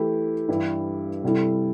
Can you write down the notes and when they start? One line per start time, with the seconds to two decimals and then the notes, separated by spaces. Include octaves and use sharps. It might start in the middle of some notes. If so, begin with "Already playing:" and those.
Already playing: E3 A3 E4 G4
0.48 G2 E3 G3 E4
1.23 C3 G3 E4 A4